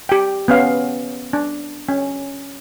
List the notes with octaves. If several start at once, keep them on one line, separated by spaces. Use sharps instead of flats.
G4 G5
B3 C#4 F5
D4
C#4